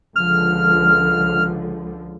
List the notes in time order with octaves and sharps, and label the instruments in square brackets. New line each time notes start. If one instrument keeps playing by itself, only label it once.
[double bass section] C#2 D3 F3 [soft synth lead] F6